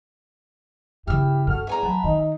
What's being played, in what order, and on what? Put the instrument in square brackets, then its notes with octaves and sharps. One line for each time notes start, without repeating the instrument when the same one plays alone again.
[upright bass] G2 C#3 [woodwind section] E4 G4 [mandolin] E6 F6
[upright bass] G2 [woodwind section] F#4 A4 F6
[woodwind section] E2 [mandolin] E5 G#5 A#5
[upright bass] F#3 [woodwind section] F#5 A5 B5
[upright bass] D#3 [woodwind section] D#4